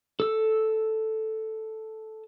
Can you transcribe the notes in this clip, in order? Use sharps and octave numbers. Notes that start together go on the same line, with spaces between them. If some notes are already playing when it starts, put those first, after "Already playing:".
A4 E6